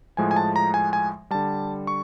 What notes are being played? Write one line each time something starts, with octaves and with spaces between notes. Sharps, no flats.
A2 F3 G#3 G#5
G#5
A5
A#5
G#5
G#5
D3 G3 A5
C#6